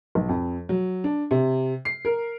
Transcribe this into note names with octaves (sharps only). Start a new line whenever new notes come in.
B1
F2
F#3
D4
C3
C7
A#4